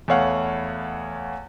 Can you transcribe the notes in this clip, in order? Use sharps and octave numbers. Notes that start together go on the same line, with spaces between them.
E2 A3 B3 C#5 F5 F#5